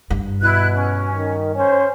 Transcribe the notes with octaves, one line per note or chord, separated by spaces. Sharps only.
G2
B2 E4 F#6
C#4
D#3
C#4 C5